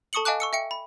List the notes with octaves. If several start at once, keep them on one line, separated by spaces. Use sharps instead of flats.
A4 A5 C#6 D#6 C#7 F#7
D#5 F5 G#5 A5 D6 F#6
C#6 E6 C#7
E5 G5 C#7
B5